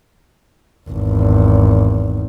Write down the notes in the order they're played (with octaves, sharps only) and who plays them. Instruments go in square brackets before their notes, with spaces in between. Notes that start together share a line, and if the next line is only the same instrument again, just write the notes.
[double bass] G#1 E2